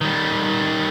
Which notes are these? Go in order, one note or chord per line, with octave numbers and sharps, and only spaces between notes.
D#3 G3